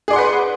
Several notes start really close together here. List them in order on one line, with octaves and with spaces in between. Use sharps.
G#4 D5 C6 F#5 B4